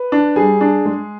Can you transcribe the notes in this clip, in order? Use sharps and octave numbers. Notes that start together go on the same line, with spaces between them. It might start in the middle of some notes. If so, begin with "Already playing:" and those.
Already playing: B4
D4
G3 G#4
D4
G#3